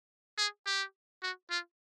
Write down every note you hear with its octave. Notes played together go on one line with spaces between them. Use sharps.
G#4
G4
F#4
F4